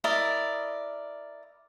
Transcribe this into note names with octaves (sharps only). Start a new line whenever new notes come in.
E4 A#4 D5 D#5